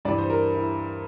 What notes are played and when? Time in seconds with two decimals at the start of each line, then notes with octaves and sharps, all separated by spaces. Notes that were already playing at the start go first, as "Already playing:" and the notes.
0.05 G2 E3 D5
0.18 C5
0.30 A#4
0.55 E4